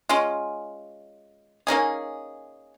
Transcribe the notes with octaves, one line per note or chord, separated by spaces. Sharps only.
G#3 C#4 F4
A#3 C#4 D#4 G#4